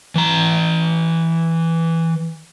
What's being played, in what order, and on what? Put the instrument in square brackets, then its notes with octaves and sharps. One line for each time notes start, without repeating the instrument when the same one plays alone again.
[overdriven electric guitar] E3 A#5